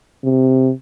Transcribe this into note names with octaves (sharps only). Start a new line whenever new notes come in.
C3